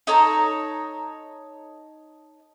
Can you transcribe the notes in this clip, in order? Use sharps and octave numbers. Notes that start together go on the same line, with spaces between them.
D#4 A4 C#5 A#5